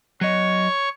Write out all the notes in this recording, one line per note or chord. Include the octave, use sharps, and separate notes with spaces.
F#3 C#5 D#5 C#6